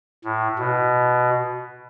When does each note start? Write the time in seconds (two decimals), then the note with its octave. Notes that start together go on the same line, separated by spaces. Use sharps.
0.24 A2
0.59 B2